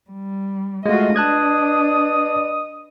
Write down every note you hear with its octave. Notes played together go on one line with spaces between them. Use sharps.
G3
G#3 A3 F4 F#4 D#5
D4 B4 D5 D#5 A5 D#6 F#6 G#6